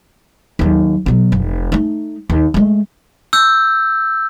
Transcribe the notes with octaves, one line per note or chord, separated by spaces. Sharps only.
D#2 F#3
B2 F#3
F1
A3 D#4
D#2
G#3 A3
E6 G6